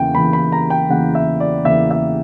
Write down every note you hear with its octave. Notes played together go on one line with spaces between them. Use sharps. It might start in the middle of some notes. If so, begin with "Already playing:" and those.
Already playing: E2 C#3 E3 A#3 G5
E2 C#3 E3 A#3 B5
B5
A#5
G5
E2 C#3 E3 A#3 F#5
E5
D5
E2 C#3 E3 A#3 E5
E5